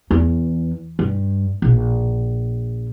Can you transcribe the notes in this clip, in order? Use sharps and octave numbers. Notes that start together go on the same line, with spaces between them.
E2
G2
A#1